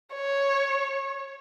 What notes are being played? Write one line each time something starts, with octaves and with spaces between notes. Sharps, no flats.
C#5